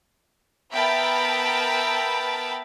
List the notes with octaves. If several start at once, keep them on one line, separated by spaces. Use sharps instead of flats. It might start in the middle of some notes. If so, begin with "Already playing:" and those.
B3 A#4 E5 G5 A5 B5